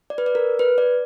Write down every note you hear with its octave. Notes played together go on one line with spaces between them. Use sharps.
D5
B4
D5
A#4
B4
D5